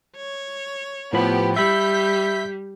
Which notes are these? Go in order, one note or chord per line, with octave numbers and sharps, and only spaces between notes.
C#5
A2 F3 B3 G4 B5
G3 E5 B5 E6 G6 B6